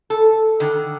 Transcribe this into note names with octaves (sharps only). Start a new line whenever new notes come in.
A4
D3 D#3